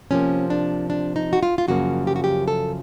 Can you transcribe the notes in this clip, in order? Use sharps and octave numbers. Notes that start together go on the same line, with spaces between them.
C3 F3 A#3 C#4
D4
D4
D#4
F#4
F4
F4
F#2 C#3 F3 A#3 F#4
G4
F#4
G4
A4